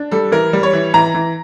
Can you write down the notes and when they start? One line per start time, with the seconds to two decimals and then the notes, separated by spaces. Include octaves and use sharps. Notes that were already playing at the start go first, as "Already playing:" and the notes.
Already playing: D4
0.11 G3 A4
0.32 E3 A#4
0.53 G3
0.63 C#5
0.73 E3
0.94 E3 A#5
1.14 E3